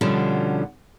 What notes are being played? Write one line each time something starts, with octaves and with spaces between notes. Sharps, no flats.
B2 D3 F3 G3 C#4